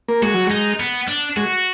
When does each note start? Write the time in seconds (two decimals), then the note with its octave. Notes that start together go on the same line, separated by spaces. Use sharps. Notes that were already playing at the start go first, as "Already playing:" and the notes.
0.08 A#3
0.22 G#3 F#4
0.34 F#3
0.47 G#3 D#4
0.80 B3
1.08 D4
1.37 G#3 F#4